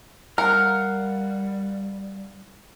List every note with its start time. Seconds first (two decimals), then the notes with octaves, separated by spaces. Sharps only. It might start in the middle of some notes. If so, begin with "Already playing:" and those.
0.38 G3 A#4 F5 F#5 F6